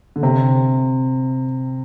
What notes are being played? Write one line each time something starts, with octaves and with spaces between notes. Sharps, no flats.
D3
C3